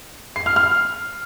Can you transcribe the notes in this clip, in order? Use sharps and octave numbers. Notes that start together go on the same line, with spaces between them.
C7
F6
F6